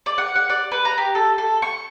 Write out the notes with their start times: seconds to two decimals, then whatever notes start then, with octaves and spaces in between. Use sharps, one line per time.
0.06 D5
0.18 F#5
0.35 F#5
0.49 D5
0.72 B4
0.85 A#5
0.98 G4
1.15 A4
1.38 A4
1.62 C#6